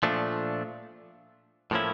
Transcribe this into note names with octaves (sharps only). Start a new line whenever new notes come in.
A#2 F3 A3 D4
A2 F3 A#3 C#4 E4